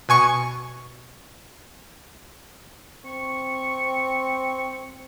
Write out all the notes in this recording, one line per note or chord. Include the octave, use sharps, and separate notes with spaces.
B2 G#5 C#6 C#7
C4 C#6